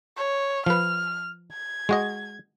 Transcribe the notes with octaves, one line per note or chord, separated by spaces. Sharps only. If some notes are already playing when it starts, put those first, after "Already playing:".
C#5
F3 B4 F6
G#6
G#3 F#4 D#5